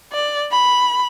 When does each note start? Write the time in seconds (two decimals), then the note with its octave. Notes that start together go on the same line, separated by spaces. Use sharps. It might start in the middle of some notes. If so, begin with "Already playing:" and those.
0.13 D5
0.52 B5